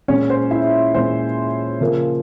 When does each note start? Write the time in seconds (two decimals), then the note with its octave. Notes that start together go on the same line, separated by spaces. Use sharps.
0.08 A#2 G#3 C#4 C#5
0.30 C5
0.51 E4 E5
0.94 A#2 G#3 C5
1.81 C#3 F3 A#3